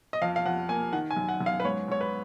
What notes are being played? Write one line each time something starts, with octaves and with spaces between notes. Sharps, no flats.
D#5
F2 F5
F5
F2 F#5
A#3 G#5
D#3 F#5
G#5
F#2
F#5
F#2
F5
B4
G#2 C#5
G#2 C#5
B4